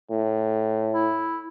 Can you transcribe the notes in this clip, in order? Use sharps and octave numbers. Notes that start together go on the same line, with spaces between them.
A2
E4